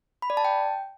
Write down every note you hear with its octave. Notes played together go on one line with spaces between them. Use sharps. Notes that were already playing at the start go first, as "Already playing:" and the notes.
B5
D5
A5
G5